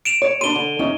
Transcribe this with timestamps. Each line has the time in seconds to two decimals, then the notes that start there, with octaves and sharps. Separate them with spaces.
0.05 D7 E7 F7
0.22 C#5
0.41 D4 B5 C6 D#7 G7
0.56 D3
0.79 E2 C#4 D#4